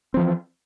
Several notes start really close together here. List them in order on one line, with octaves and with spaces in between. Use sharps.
C4 F3 E3